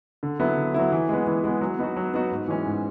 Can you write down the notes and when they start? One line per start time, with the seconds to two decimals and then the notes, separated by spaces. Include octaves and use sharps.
0.23 D3
0.40 F#3 B3 E4
0.57 D3
0.74 F#3 B3 E4
0.92 E3
1.09 G#3 B3
1.27 E3
1.44 G#3 B3
1.61 F#3
1.79 B3 D#4 F#4
1.97 F#3
2.14 B3 D#4 F#4
2.31 G#2
2.48 E3 G#3 C#4
2.66 G#2